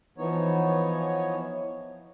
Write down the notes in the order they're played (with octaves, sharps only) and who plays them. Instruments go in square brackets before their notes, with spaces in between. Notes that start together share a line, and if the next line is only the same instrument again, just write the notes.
[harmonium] E3 F3 B3 D#4 C#5